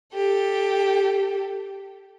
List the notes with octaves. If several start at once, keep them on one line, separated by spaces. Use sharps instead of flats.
G4 A4